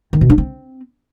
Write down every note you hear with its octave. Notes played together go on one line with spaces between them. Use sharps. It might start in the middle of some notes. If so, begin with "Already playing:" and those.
D#3
B2
D4
C4